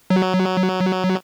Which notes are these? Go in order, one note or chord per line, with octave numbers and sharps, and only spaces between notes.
F#3